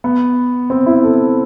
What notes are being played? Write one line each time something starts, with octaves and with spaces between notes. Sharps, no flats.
B3
C4
E4
A4